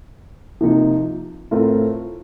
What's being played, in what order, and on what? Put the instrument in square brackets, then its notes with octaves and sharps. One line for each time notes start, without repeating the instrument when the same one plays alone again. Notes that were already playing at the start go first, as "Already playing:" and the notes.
[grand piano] C3 F3 A#3 D#4
A2 A3 C4 F4 A#4